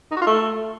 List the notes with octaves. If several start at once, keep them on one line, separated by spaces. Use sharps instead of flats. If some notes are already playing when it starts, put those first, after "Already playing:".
D#4
F#4
F4
A3